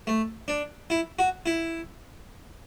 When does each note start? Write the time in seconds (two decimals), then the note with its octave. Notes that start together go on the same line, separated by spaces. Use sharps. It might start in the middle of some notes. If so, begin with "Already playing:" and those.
0.07 A3
0.48 D4
0.90 E4
1.19 F#4
1.46 E4